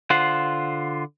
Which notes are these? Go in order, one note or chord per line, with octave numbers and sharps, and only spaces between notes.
D3 F4 C5 F#5